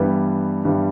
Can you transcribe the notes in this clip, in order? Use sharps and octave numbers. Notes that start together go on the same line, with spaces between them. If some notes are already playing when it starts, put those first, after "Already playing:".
Already playing: G2 E3 G3 B3
G2 E3 G3